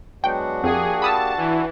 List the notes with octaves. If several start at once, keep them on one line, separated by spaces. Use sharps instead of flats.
F#3 G#3 B3 D4 F#4 F#5 G5
F2 A#3 G4 G#4
A5 B5 D#6 E6
E3